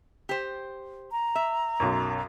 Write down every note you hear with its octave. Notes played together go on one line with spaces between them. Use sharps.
G4 C5
A#5
E5
B1 F#2